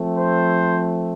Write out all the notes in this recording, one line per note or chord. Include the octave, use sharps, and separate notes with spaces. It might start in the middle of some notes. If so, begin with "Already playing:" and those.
Already playing: F3 A3 C4
C5